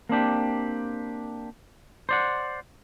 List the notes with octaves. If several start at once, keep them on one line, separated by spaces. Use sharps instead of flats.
A#3 C4 D4 G4
C5 D5 F#5